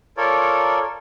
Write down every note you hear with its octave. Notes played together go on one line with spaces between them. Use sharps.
F4 A4 A#4 C#5 D5